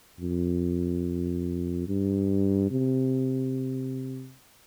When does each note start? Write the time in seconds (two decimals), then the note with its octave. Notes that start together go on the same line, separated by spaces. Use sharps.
0.21 F2
1.88 G2
2.71 C3